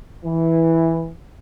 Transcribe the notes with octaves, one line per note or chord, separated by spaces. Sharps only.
E3